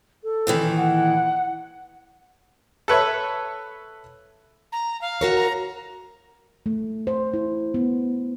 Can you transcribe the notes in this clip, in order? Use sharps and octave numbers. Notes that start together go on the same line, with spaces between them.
A4
A#2 D#3 E3
F#5
A4 B4 C#5 E5
A#5
F5
F#4 A#4 C#5
A#5
A3
C5
E4
B3